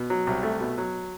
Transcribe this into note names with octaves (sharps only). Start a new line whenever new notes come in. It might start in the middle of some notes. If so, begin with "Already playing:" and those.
Already playing: B2
F#3
C2
A3
B2
F#3